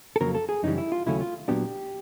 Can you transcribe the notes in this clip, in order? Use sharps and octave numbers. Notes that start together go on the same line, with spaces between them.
A4
F2 C#3 F#3 A#3 A#4
A4
G#4
F#2 C#3 E3 G3 D#4
E4
F4
D#2 C#3 F#3 A3 C#4 E4
F4
A#2 F#3 B3 D4 G4